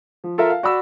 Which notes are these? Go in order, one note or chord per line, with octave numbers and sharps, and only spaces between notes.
F3
F4 A4 A#4 E5
F5
F#4 D5 F#5 B5 E6